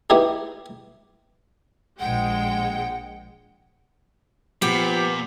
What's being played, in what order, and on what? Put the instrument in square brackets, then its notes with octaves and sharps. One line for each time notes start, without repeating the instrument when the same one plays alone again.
[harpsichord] B3 D#4 E4 G4 G#4
[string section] A#1 G#3 G5 [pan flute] F#5
[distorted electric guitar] A#2 [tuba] F3 [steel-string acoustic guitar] B3 [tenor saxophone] G4